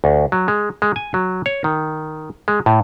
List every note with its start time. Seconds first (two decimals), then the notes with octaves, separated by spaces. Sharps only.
0.04 D2
0.32 F#3
0.48 G#3
0.82 G#3
0.96 G#5
1.14 F#3
1.46 C#5
1.64 D#3
2.48 G#3
2.66 A2